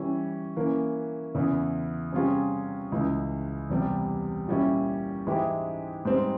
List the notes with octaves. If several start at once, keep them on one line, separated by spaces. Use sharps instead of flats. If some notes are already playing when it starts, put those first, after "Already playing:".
Already playing: E3 G3 C#4
E3 A#3 C#4
E2 C#3 E3
C3 G3 C#4 F4 G#4
C#2 C#3 E3 G#3
E2 C3 G3
A#2 G3 C#4 E4
G#2 E3 G#3 E4 G4
G#2 G3 C4